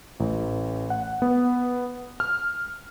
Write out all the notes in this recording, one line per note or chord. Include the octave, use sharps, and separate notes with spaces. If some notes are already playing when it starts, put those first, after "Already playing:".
A1
F#5
B3
F6